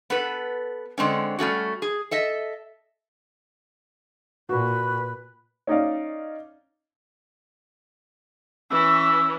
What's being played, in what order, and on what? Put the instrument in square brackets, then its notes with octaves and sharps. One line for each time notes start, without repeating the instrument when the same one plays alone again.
[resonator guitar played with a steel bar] B3 A4 B4
D3 G#3 C4 C#4
G3 A3 C#4 F#4
G#4
A4 D#5 E5
[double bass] A#2 [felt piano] F#4 [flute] B4
[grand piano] C#4 D#4 D5 F5
[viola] E3 C#4 [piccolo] E6